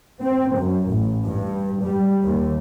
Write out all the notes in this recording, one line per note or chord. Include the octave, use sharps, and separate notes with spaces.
C4
F#2
A1
G2
G3
D#2